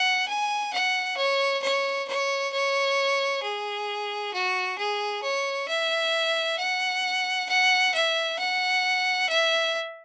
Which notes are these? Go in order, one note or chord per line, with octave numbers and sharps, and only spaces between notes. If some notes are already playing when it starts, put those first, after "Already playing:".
Already playing: F#5
G#5
F#5
C#5
C#5
C#5
C#5
G#4
F#4
G#4
C#5
E5
F#5
F#5
E5
F#5
E5